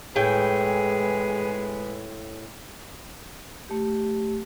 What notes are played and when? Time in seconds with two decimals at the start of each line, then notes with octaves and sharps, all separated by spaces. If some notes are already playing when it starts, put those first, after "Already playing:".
0.16 A2 G#3 G#4 B4 G5
3.69 A3 G4